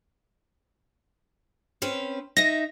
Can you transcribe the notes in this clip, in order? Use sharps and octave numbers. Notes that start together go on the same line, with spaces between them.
C4 C#4 B4
D#4 E5 A#6